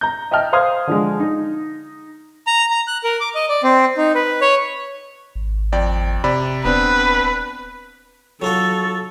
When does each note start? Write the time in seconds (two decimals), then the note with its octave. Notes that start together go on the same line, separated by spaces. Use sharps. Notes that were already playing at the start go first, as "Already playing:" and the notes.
0.01 A#5 G6
0.31 D#5 E5 G5 A5 F6
0.53 C5 F5 C6 D#6 F6 G#6
0.87 D3 F3 G#3
1.20 D#4
2.47 A#5
2.71 A#5
2.87 F#6
3.04 A#4
3.20 D6
3.35 D#5
3.49 D5
3.63 C4
3.97 D#4
4.15 B4
4.41 C#5
5.35 G#1
5.72 F2 D5 G5
6.24 C3 D5 B5
6.65 D#1 B3 C4 D4 B4
8.42 F#3 F4 F#4 A4